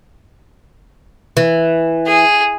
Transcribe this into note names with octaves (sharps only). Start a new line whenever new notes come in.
E3
G#4